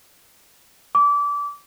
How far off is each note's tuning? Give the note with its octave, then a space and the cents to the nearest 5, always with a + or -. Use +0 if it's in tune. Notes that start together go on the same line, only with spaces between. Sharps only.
D6 -25